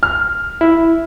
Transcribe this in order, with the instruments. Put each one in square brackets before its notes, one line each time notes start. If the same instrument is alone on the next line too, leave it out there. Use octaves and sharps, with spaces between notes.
[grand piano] F6
[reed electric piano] E4